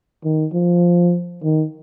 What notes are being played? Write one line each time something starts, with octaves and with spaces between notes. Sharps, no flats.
D#3
F3
D#3